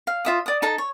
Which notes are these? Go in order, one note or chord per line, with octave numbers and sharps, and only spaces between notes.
F5
F4 E5 D#6
D5 D#6
D#4 A4 A5
C#5